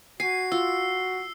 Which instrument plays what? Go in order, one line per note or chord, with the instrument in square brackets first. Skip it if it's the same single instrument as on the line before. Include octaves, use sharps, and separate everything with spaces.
[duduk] F#4 [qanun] G#5 [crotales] C7
[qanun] F4 [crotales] E6